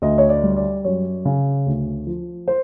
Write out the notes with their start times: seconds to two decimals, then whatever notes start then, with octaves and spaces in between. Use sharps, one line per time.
0.02 D2 D#5
0.18 C#5
0.29 D5
0.43 G3
0.57 D5
0.84 F#2 C#5
1.25 C#3
1.66 D2
2.07 F3
2.48 C5